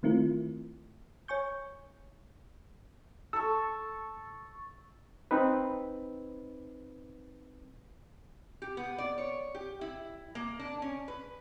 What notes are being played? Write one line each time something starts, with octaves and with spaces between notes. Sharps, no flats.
D#3 A3 C4 E4 F4 A#4
C#5 G#5 C#6 G6
A4 C#6 E6
C4 D#4 B4
G4
B3
D5
C#5
G4
E4
A#3
D4
C#4
B4